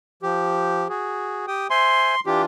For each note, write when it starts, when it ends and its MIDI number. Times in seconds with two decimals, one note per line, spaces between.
0.23 0.88 53
0.23 0.88 67
0.89 1.46 66
0.89 1.46 68
1.48 1.67 67
1.48 1.67 79
1.48 1.67 87
1.70 2.15 72
1.70 2.15 76
1.70 2.15 80
1.70 2.20 84
2.26 2.45 52
2.26 2.45 62
2.26 2.45 65
2.26 2.42 67